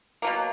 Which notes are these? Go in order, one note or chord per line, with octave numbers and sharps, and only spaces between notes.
B2 F#3 A#3